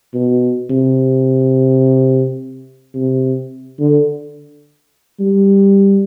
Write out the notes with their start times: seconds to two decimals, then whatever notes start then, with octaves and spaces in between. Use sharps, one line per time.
0.14 B2
0.70 C3
2.94 C3
3.79 D3
5.20 G3